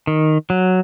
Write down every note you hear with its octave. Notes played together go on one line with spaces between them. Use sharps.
D#3
F#3